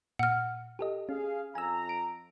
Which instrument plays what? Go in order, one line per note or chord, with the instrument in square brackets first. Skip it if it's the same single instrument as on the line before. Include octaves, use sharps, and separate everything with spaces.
[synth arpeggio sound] A#2 [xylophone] F#5 F6
[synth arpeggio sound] G4 A4 D#5
[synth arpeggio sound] C#4 [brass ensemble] G#4 F5
[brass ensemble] F2 A#5 [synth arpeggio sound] G#5 E6
[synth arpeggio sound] D7